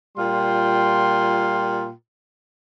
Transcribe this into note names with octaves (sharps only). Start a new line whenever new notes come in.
A#2 G3 F4 G5 C6